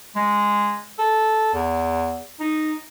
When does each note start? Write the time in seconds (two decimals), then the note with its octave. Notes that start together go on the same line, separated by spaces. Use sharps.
0.16 G#3
0.99 A4
1.54 E2
2.40 D#4